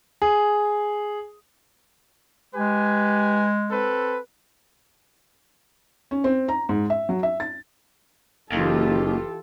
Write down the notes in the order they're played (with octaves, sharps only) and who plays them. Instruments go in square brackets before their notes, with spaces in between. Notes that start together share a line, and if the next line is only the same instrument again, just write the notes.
[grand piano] G#4
[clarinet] G#3 [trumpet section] G4 B4 G#5
[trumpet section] C4 A4 B4
[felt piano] C#4
C4
A#5
G#2
E5
F#3
E5
A6
[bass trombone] F#1 [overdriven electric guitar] D#2 [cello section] E3 F4 [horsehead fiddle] G4 A4